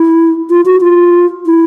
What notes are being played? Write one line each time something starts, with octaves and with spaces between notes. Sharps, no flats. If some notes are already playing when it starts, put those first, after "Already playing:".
Already playing: E4
F4
F#4
F4
E4